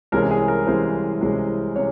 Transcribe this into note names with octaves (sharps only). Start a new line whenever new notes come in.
C2 C3 E3 G#3 C#4 A#4
G#4
A#4
C2 C3 E3 G#3 C#4 C5
C2 C3 E3 G#3 C#4
C3 C#5